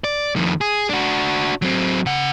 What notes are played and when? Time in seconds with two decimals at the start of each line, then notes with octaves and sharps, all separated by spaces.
0.04 D5
0.36 F2 D#3
0.61 G#4
0.89 D4 F#4
1.62 F#3 C4
2.06 C#3 F#5